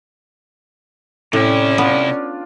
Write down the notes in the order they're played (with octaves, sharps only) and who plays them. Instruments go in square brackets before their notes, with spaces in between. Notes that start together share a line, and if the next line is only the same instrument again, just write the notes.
[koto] A2 [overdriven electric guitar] C3 E4 [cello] C#4 [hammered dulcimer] D5 G5
[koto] B3 [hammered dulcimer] D4 F4